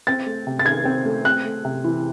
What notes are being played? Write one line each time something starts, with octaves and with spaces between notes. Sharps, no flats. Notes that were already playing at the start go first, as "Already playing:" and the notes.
C4 A6
A3
C3
A6
D#3 G#6
C4
A3
C4 F#6
A3
C3
E3